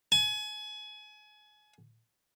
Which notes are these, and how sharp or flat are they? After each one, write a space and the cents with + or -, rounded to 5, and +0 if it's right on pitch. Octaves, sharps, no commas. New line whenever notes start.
G#5 +30